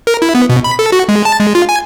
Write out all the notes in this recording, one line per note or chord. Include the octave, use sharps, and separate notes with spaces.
A#4
E4
B3
B2
B5
A4
F#4
G#3
A5
G#3
F4
G#5